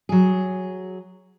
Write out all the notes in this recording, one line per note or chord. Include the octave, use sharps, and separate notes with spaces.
F#3 G#4